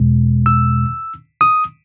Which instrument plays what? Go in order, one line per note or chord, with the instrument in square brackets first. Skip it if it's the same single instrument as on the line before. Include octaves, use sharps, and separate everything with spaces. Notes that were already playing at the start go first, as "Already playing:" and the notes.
Already playing: [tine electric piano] E2 B2 G#3
E6
D#6